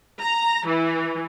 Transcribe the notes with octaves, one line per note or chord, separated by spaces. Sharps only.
A#5
E3